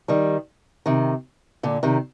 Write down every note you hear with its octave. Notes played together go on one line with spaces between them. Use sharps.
D#3 G3
C3 D#3
A#2 D3
C3 D#3